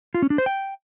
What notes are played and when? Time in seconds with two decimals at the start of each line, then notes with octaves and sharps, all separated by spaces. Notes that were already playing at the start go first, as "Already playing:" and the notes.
0.14 F4
0.22 C#4
0.30 D4
0.38 C5
0.46 G5